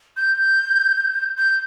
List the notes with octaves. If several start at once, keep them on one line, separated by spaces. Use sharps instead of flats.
G6
G6